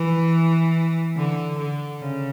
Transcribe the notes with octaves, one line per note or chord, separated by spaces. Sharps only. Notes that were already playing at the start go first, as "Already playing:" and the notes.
Already playing: E3
D3
D3
C#3